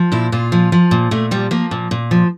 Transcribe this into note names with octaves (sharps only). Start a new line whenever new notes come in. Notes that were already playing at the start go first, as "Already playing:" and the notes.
Already playing: F3
A#2 E4
A#2 F4
F3
F3
A#2
A#2 A3
F3 G3
F3 A#3
A#2
A#2
F3